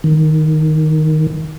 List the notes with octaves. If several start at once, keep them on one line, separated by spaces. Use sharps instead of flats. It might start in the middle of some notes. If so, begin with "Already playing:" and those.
D#3